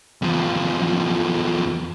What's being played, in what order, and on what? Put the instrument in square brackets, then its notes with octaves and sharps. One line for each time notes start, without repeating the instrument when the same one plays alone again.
[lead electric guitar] E2 F3